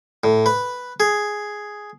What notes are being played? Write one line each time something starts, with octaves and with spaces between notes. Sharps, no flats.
A2
B4
G#4